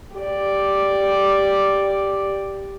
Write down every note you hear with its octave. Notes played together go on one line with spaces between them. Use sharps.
G4 D5